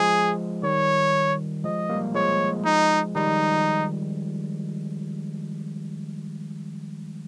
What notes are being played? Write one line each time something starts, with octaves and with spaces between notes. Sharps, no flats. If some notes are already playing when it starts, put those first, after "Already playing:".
Already playing: F3 G#3 G#4
D#3 G3 C#5
F3 G#3 D#5
G3 A#3
F3 G#3 C#5
D#4
D#3 G3 D#4